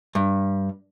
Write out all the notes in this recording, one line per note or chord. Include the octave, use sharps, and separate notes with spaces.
G2